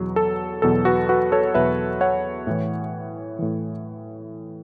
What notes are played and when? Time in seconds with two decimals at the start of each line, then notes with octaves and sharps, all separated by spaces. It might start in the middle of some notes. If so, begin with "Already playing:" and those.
Already playing: E2 B2 F#3
0.16 A4
0.62 E2 B2 F#3 A4
0.85 F#4 B4
1.09 F#4 B4
1.32 A4 C#5
1.54 E2 B2 F#3 B4 E5
2.01 C#5 F#5
2.47 A2 E3
3.39 A2 E3